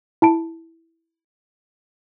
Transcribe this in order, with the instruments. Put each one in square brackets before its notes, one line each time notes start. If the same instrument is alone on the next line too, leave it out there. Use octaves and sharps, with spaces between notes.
[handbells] E4 A5 D7